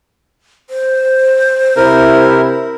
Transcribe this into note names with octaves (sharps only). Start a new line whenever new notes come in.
C5
C3 E4 A#4